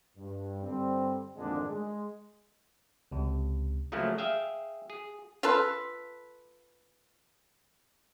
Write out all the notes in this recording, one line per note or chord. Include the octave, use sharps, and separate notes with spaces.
G2
G2 D3 G3 C4
G#1 F2 A#2 D3 G#3 D4
G#3
C#2 C3
C#3 F3 F#3 A3 A#3 C#4
G#4 E5 F5 G5
G#4
F4 A4 B4